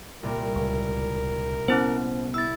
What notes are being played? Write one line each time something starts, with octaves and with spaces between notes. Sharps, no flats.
C2 A#2 A#4
C#2
B3 C#4 E4 C5
E4 E6 A6